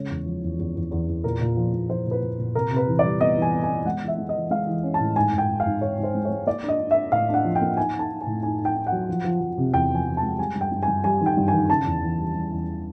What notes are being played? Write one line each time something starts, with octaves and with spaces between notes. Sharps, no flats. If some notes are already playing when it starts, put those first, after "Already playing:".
Already playing: C#3 G#3 C#5
E2
F3
E2
E2
E2
E2
E2
A#2 A#4
A#2
F3
A#2
F3 C5
A#2
B4
A#2
A#2
C3 A#4
C3
B4
E3
D5
G3
B3 D#5
E3
G#5
B3
G#5
B3
G#3 F#5
E3
E5
G#3
D#5
E3
G#3 F5
E3
C#4
A5
A2
G#2 G#5
G#2
G5
G#2
F5
G#2
G#2 C#5
G#2
C5
G#3
C#5
G#3
A#3 D5
D4
D#5
D4
E5
D4
A2 F5
D4 F#5
F3
G5
A#3
D#4 G#5
D#4 A5
D#4
G#5
A2
D#4 G#5
D#4
G5
D#4
F#5
F#3
F3
F3
F3
C3
E2 G5
F3 G#5
F3
A5
G#3
G3 G#5
G2
G5
G2
G#5
G2
G3 G#5
D#3
G5
G2
G#5
D#3
C#3 A5
E2
E3
G3
G3
E2